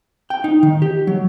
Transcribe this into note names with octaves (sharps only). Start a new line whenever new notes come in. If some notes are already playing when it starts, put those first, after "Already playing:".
G5
D#4
D#3
G4
F#3